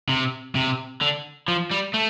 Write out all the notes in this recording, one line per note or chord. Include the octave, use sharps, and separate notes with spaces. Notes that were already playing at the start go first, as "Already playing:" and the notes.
C3
C3
D3
F3
G3
A3